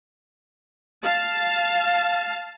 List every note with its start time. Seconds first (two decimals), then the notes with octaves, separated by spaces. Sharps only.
1.04 F5 A5